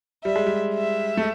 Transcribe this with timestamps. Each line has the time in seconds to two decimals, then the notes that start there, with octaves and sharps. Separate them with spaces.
0.24 G3 E5
0.36 G#3
0.46 G3
0.75 E5
1.17 A3